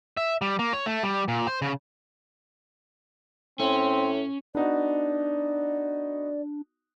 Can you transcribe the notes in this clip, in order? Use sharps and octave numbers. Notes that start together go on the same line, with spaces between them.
E5
G3
A#3
C#5
A3
G3
A#2
C5
C#3
A2 C4 C#4
B3 D4 D#4 F#4 D5